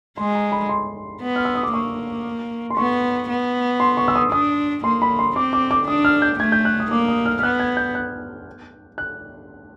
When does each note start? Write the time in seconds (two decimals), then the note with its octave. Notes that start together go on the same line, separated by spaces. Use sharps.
0.17 G#3 C6
0.35 A#5
0.52 B5
0.69 C6
1.21 B3
1.36 F6
1.45 E6
1.55 D#6
1.63 D6
1.73 A#3 C#6
2.70 C6
2.77 B3 C#6
3.29 B3
3.80 C6
3.97 C#6
4.08 E6
4.16 D#6
4.32 D4 D#6
4.84 A#3 C6
5.02 B5
5.19 C6
5.36 C4 D6
5.53 D6
5.71 D6
5.87 D4 D#6
6.04 F6
6.22 G6
6.39 A3 G#6
6.52 G6
6.65 F#6
6.80 D#6
6.91 A#3 D6
7.08 D#6
7.26 F6
7.39 F6
7.43 B3 F#6
7.60 G#6
7.77 G6
7.95 F#6
8.98 F#6